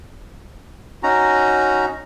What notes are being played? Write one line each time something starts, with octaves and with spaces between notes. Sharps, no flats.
C#4 D#4 F#4 A#5